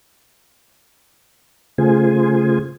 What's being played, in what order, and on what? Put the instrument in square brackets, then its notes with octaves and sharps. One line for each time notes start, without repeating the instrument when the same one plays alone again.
[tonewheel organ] C#3 A3 F4 G#4 C5 G#5